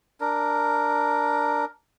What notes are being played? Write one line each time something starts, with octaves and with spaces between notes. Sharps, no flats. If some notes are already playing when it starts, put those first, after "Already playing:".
D4 A#4